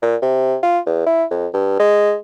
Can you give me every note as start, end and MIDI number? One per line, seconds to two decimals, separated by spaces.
0.02 0.16 46
0.22 0.56 48
0.63 0.79 65
0.86 1.05 40
1.06 1.24 64
1.31 1.47 41
1.53 1.79 43
1.80 2.16 56